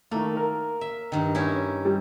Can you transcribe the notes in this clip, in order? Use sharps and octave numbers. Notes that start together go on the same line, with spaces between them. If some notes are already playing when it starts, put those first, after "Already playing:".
D#3 A3 A#3
A#4
E5
G2 D#3
C#4 D#4 E4
G3